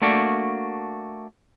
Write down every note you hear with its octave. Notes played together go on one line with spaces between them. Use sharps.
A3 A#3 D4 F#4